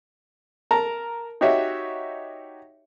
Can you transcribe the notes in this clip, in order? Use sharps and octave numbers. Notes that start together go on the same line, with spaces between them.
A#4 A5 A#5
D#4 F#4 G4 C#5 E5